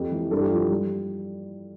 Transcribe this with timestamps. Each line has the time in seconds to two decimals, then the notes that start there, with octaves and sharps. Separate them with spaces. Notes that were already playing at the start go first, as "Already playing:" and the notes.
Already playing: F2 G4
0.12 E3
0.31 G2 A4
0.41 G4
0.51 F3 F4
0.70 G3